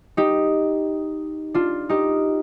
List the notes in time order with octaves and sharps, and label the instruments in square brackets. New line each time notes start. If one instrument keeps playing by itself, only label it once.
[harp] D#4 G4
D4 F4
D#4 G4